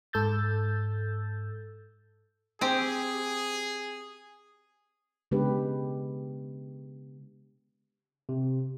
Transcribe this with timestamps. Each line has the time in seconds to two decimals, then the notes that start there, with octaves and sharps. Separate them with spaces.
0.13 G#2 A4 E6 G6 A6
2.61 C4 G4 G#4
5.31 C#3 G#3 B3 D4 G4 B4
8.29 C3